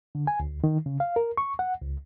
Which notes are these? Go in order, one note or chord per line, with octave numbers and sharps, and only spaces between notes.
D3
G#5
D2
D#3
C#3
F5
A#4
C#6
F#5
C#2